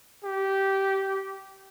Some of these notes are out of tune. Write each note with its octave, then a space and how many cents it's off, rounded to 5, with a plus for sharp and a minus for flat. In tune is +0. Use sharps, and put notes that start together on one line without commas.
G4 -15